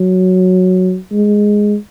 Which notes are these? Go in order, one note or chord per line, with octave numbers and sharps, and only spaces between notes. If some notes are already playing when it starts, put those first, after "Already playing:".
Already playing: F#3
G#3